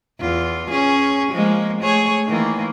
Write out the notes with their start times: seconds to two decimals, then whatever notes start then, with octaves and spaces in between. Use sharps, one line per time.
0.20 E2 F4
0.70 C#4 G#4 C#5
1.32 F3 G#3 A#3
1.81 A3 G#4 C#5
2.27 D#3 E3 A#3